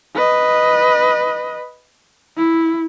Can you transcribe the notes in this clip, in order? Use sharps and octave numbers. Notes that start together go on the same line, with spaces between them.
B4 D#5
E4